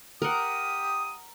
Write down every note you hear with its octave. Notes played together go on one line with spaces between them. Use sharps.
G4 A#4 F#5 D#6